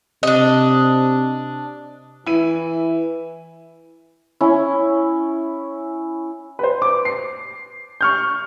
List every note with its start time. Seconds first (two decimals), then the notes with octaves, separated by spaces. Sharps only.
0.23 C3 D4 D#5
2.26 E3 E4 D#7
4.41 C#4 E4
6.59 B4 C5
6.82 D6
7.05 C7
8.01 C#6 F6 G6